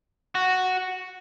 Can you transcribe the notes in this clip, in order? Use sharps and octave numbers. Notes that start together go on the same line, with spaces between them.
F#4